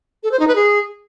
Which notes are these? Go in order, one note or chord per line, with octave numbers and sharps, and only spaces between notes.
A4
C5
D#4
B4
G#4